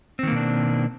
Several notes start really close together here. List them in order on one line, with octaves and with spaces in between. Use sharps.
C4 D#3 A#3 B2 D4